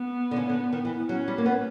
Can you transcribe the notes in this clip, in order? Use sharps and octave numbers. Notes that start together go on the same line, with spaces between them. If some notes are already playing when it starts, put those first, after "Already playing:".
Already playing: B3
D3
C#3
D3
D#3
E3
F#3 C#4
G3
A#3
B3